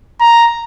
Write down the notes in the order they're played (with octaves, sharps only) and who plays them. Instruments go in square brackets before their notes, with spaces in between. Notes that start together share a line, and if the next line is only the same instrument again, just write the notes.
[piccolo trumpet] A#5